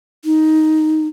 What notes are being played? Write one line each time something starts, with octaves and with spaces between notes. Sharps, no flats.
D#4